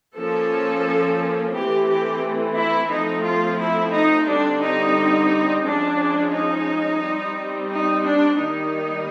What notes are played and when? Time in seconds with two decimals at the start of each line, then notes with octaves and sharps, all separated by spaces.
0.16 F3 A#3 C#4 A4
1.53 E3 A3 C4 G4
1.87 G4
2.56 E4
2.90 F3 A3 C4 D#4
3.24 F4
3.59 E4
3.93 D#4
4.27 D3 G3 C4 D4
4.61 D#4
5.65 F3 G#3 C#4 D4
6.33 D#4
7.02 G3 C4
7.70 D#4
8.04 D4
8.39 D#3 G3 A#3 D#4